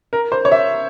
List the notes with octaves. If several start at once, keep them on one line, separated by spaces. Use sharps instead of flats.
A#4
C5
C#5
E5